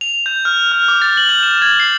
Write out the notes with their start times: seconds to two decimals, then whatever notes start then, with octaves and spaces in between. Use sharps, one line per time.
0.01 F7
0.26 G6
0.45 F6
0.72 F6
0.88 D6
1.02 A6
1.17 F#7
1.29 G6
1.43 E7
1.62 G#6
1.80 C7